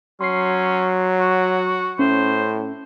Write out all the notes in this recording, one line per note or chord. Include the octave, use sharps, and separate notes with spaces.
F#3 C#4 C6 C7
F#4
A2 C#4 C5